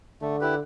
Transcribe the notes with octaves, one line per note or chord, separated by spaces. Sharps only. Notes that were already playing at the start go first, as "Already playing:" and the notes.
D3 A3
E4 G4 B4